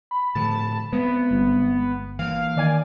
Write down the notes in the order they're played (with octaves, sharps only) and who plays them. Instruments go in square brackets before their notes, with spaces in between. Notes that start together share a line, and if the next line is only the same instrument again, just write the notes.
[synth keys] B5
[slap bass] A2 D3 F3 [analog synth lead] A5
[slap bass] G#3 C4 [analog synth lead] B3
[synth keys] G1
[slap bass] E3 A#3 [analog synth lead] F5
[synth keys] D#3 D5 G#5